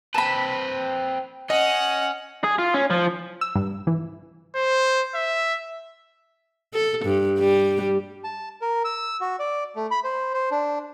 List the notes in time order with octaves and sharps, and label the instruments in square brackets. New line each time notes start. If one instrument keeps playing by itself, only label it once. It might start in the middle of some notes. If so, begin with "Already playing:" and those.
[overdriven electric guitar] C4 B4 [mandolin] A5 B5
[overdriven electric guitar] C#4 [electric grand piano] D#5 [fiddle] F#5
[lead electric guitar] G#4
F4
C#4
F3
[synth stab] E6
G2
E3
[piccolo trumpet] C5
E5
[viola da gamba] A4
G2
G3
[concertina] A5
A#4
E6
F#4
D5
A3
B5
C5
C5
D4